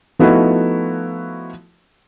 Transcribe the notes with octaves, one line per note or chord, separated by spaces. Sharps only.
F3 A3 B3 D#4 E4 F#4